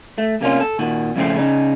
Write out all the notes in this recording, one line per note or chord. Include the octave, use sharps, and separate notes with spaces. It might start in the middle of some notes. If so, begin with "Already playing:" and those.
A3
C3 A#3 C#4 F4
A4
A#2 D#3 F#4
F2 A2 C#3 G#3 A3 C4
C#3 D#4